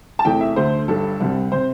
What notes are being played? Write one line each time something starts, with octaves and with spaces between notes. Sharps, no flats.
A5
E2 C3 E3 A3 G5
E5
D2 D3 A3 C5
G1 G2 G3 A4
C2 C3 G3
C3 C5